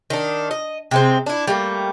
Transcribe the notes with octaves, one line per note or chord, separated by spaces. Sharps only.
D#3 D4
D#5
C3 G#3 C4
D4 E4
G3 A3 A#3